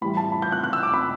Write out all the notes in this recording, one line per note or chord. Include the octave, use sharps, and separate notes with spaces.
A2 E3 G3 B5
A5
B5
G6
F#6
F#6
E6
D6
B5